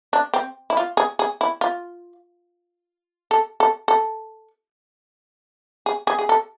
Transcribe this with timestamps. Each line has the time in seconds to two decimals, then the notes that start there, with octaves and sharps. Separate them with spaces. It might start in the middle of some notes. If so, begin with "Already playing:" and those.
0.13 D4
0.34 C4
0.70 E4
0.77 F4
0.97 G#4
1.19 G#4
1.41 E4
1.61 F4
3.31 A4
3.60 A4
3.88 A4
5.86 G#4
6.07 G#4
6.19 G#4
6.29 A4